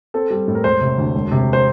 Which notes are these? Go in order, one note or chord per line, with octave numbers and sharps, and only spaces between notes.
C4 A4
G3
A2
A#4
E1 C5
C3
D2
E1
C3
C5